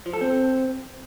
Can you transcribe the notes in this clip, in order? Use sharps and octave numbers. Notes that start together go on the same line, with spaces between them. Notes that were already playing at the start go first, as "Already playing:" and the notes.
F3
A4
C4